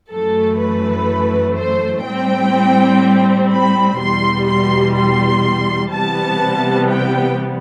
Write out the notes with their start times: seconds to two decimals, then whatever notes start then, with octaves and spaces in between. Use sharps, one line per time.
0.12 F#2 E3 A3 A4
0.60 B4
1.56 C5
2.05 A2 G3 C4 G5
3.51 B5
3.99 E2 B2 G3 C6
4.47 C6
4.96 C6
5.93 C3 E3 G3 B3 A5
6.89 G5